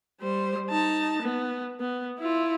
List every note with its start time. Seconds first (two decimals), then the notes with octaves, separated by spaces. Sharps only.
0.21 G3 C5
0.70 D#4 A5
1.23 B3
1.80 B3
2.20 E4 F4